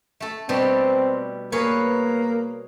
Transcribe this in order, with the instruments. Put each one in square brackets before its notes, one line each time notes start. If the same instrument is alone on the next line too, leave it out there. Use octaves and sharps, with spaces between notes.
[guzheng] A3 A4
[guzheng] B2 G3 D4 [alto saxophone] C4
[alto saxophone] A#3 [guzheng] G#4 B4 C#5